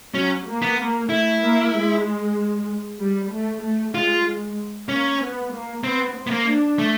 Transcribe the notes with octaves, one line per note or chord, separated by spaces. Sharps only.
F#3 C#4
A#3
B3
A#3
A3 E4
A#3
G#3
G3
A3
A3
G#3 F4
G#3
A#3 C#4
B3
A#3
B3 C4
C4
B3
A#3
D4
A3